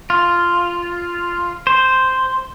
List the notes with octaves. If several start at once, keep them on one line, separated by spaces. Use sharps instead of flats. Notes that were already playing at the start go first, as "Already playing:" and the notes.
F4
C5